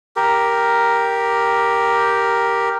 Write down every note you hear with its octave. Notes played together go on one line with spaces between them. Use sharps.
G4 A#4